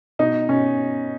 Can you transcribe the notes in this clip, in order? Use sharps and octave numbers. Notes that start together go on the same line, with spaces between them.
B2 D#4
B2 C#4